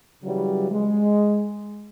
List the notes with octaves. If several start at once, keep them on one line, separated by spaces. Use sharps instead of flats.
C#3 E3 F#3 G3
G#3